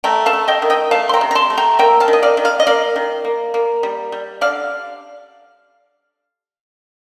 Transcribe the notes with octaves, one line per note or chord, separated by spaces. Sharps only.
A3 G5 A#5
F5 A5
A3
D#5 G5
D#3
D#5 G5
A3 F5 A5
C6
G5 A#5
C3
A#5
A5 C6
A3
G5 A#5
A#3 G5 A#5
F5 A5
D#3
D#5
D5 F5
D#3
D5 F5
D#5
A#3 D5 F5
D#3
A#3
A#3
G3
G3
D3 D5 F5